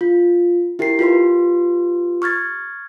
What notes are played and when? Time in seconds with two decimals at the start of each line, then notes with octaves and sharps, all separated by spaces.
0.01 F4
0.79 E4 G4 A#4 G5 C7
0.99 F4 G4 B4 C6
2.22 C#6 F6 G#6 A6